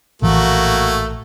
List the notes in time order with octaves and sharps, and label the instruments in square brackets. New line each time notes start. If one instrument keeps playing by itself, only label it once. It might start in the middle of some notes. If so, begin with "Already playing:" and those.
[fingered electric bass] A#1 A2 E3 [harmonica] A3 A#3 F#4